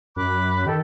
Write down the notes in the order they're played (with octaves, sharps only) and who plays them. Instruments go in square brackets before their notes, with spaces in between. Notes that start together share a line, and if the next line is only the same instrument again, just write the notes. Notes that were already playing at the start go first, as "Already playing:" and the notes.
[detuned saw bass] F#2 [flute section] B5 D6 F#6
[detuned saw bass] D#3 [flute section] G4 A4